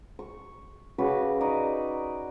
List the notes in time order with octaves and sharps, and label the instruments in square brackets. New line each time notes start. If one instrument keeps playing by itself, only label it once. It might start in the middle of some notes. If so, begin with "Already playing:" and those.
[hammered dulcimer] C#6
C#3 F#4 B4 D6
D#4 D5 D#5